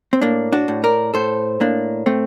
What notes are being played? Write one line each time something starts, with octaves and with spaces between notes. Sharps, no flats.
C4
A2 A#3 D4
D4 F#4
A2
A#4 D5
A2 A4 C5
A2 A#3 D4
A2 A3 C4